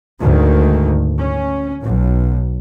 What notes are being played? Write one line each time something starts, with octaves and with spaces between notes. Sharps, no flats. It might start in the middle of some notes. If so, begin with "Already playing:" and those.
D2 G#2 D#3
C#4
B1